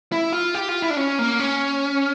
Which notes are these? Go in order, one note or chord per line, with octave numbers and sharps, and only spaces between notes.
E4
F4
G4
F4
E4
D4
C#4
A#3
C#4